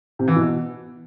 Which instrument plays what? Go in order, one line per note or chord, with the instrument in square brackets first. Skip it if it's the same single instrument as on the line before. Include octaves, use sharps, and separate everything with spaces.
[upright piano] C3
E3
B2